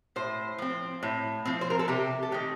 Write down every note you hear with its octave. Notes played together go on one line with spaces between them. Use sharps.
A2 C5
F3 C4
A2
F3 C4
C5
A#4
A4
C3 G4
A4
D#3 A3 C4 G4